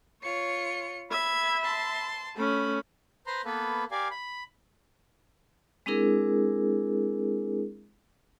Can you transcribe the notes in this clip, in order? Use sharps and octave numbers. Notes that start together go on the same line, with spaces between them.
F4 C#5 C#7
E5 B5 G#6
A5 C6
A3 C#4 B5
B4 C5 A#5 C6
A#3 B3 A4 B4
G4 A#4 D5 F5 G#5
B5
G#3 C4 D4 E4 G#4 A#4